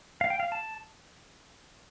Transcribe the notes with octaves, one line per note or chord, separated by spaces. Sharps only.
F5
G5
F5
A5